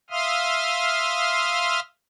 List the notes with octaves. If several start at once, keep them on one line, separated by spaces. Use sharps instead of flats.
E5 F5 C6 D#6 F6